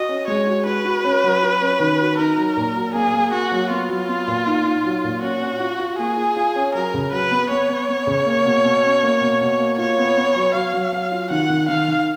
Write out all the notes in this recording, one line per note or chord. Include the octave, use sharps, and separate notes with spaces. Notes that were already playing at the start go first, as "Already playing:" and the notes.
Already playing: F#4 D#5
C#4
G#3 C#5
F#4
F#4 B4
F#4
C#4
F#3
F#4
C#4
D#3
F#4
D#4 A#4
F#3
A#2
F#3
A#3 G#4
A#3
A#3 F#4
F#3
B3 F4
F#3
B3
A#2
D#4
D#4
F#3
A#2
C#4 F#4
C#4
F4
F4
A#3 G#4
F4
F4
C#4
F#3 A#4
C#3
F#3 B4
B3
B3 C#5
B3
B3
C#3
A#3
B2
B2
C#4
A#3
B2
B2
A#3
F4 C#5
B3
B3
F#3
F#3 F5
F#3
F#3
F4
D#3 F#5
D#3
D#3 F5
D#3